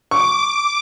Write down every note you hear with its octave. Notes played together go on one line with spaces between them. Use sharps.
C#6 D6